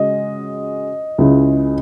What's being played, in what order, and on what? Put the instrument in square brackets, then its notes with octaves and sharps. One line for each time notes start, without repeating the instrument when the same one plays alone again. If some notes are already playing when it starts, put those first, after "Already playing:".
Already playing: [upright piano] C#3 G#3 C#4 F#4 [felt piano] D#5
[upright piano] C#2 C#3 G#3 C#4 E4